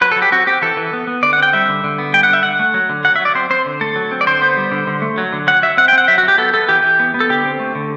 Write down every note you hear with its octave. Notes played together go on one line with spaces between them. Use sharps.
F#3 B4
A4
F#3
G4
C4 F#4
C4 G4
E3 A4
E3
B3
B3
D3 D5
F#5
C4 G5
G3 E5
D3
D3
B3
G3 G5
F#5
D3 E5
D3 F#5
A3
F#3
D3
F#3 F#5
E5
F#3
D5
C4 C5
C4 C5
D3
A3 A4
F#3
C4
D5
D3 C5
B3
G3
D3
D3
A3
F#3
D3
F#3 F#5
F#3 E5
C4 F#5
G5
C4
F#5
F#3 E5
F#4
F#3 G4
B3 A4
B3 A4
E3 G4
E3
B3
B3
A4
D3 G4
C4
A3
D3